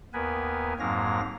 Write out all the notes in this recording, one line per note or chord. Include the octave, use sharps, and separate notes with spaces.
D#2 B3 A#4 B4 G#5
F2 G#2 F#3 A#3 F5 A#6